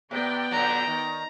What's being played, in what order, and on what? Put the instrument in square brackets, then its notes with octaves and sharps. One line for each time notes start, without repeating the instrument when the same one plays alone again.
[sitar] C3 [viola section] B3 D5 G5
[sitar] A#2 D3 F#3 [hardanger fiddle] A#5
[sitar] D#3